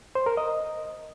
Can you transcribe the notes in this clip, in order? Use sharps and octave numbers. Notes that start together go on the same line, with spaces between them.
C5
A#4
D#5